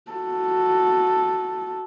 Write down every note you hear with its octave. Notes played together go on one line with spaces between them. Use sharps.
F#4 A4